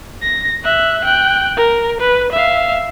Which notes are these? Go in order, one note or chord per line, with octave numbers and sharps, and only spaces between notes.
A#6
E5 F#6
G5 F#6
A#4
B4
E5 F5